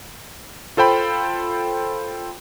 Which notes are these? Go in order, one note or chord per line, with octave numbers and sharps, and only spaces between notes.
F4 A4 C5 G5 B5